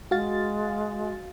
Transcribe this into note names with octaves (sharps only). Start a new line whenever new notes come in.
G#3 F#4 F5 A6